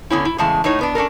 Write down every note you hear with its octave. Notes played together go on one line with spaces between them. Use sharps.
D3 B3 C#4 E4
E4
E2 A2 C#3 G#3 A5
A2 A3 D#4 C#5
B2 B3 D4
C#4 D4 A4 A#4